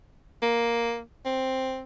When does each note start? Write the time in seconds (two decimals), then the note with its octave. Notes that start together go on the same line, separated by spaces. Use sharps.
0.43 A#3
1.25 C4